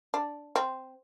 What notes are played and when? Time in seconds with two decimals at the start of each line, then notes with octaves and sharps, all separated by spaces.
0.14 D4
0.56 C4